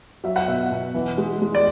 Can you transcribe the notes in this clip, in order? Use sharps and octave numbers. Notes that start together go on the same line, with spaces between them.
F#3 E5
F#5
B2 E5
B2
E3
G#3
G#3
D5